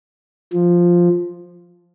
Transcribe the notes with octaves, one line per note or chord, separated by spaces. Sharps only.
F3